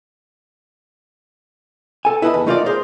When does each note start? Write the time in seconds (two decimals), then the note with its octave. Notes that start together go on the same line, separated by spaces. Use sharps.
2.05 A4 G#5
2.22 E4 B4 D#5 A5
2.34 E2
2.47 A3 D#4 F4 A#4 C5 D5
2.66 G#4 A#4 C5